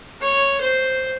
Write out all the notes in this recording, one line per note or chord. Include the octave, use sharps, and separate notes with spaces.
C#5
C5